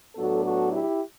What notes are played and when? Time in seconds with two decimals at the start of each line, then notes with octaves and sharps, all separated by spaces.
0.15 A2 F#3 B3 D4 F#4 A4
0.44 F#4 A4
0.72 E4 G4